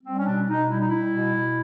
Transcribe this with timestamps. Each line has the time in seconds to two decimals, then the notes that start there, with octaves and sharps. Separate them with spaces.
0.04 G3 C4
0.18 C#4
0.26 B2 D4
0.48 B2 D#4
0.69 G3 E4
0.79 D#4
0.88 G3 E4
1.12 B2
1.35 B2